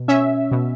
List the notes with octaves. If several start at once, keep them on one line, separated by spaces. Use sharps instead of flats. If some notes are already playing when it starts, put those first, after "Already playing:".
Already playing: B2
C#4 E5
B2